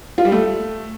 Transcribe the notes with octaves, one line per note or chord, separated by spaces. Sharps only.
F4
G3
A3